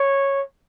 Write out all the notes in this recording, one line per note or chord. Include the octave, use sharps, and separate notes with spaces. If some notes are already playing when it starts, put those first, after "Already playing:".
Already playing: C#5